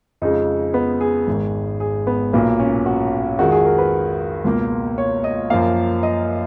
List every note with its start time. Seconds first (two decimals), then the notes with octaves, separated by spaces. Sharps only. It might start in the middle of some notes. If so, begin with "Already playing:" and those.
0.22 F2 C#3 G#3 D#4
0.74 B3
1.01 G#4
1.27 G#1 G#2 D#3
1.80 G#4
2.07 B3
2.33 B1 A#2 F#3 A#3 B3
2.60 C#4
2.86 F#4
3.39 F2 D#3 G#3 F#4
3.52 G#4
3.65 A#4
3.78 B4
4.45 C#2 B2 A#3
4.98 C#5
5.24 D#5
5.50 F#2 F3 A#3 F5
6.03 D#5